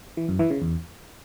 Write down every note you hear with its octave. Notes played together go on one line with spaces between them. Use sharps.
E3
F#2
E3
C#3
E2